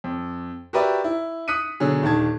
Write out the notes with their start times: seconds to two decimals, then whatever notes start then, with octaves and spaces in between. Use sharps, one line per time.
0.04 F2
0.73 F#4 G4 A#4 B4 D5 E5
1.04 E4
1.48 D#6 F#6 B6 C#7 D#7
1.80 B2 D3 F#3 G#4
2.02 D#1 D#3 D4 A5 G#6